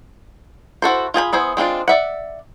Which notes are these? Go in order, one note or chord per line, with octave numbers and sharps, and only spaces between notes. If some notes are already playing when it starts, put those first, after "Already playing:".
E4 F#4 A4 C5
F4 G#4 G#5 B5
B3 E4 G#4 C5
G#3 C4 D4 F4
D5 E5 F#5